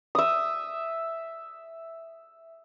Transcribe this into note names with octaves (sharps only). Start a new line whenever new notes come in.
E5 D#6